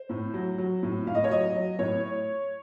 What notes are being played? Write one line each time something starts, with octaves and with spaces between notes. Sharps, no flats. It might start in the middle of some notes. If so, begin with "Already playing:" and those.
Already playing: C5
A2
F#3
F#3
A2
A2 F5
D#5
C#5
F#3 D#5
F#3
A2 C#5